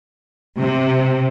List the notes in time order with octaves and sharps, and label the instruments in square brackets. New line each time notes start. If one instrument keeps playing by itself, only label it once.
[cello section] C3